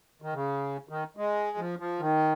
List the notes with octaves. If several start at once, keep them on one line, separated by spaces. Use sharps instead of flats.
D#3
C#3
D#3
G#3
F3
F3
D#3